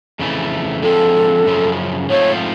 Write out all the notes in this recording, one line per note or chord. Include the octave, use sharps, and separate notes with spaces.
F2 C#3 E3 A3
D3 F3 G#3 C4 A4
F#2 C#3 F3
G#2 F3 A3 C4 F4 C#5